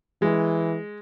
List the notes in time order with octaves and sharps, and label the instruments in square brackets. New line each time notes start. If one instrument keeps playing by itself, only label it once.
[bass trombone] E3 [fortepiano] G#3